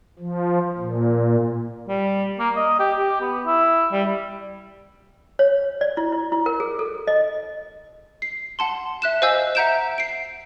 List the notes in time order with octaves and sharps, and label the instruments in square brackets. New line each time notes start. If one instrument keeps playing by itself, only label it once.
[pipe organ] F3
A#2
[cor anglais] G3
A#3
D#5
G4
G4
B3
E4
G3
[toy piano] C#5
D5
E4
E4
E4
A#4
G#4
A4
D#5
[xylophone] C7
F#5 A5 C6
E5 F#6 E7
C5 D#5 F5 G#5 E6 G6
E5 F#5 A#5 G6 D7 E7
C7 D7